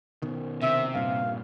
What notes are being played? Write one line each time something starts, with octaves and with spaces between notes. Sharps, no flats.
B2 D#3
C3 E5
G2 A#2 F5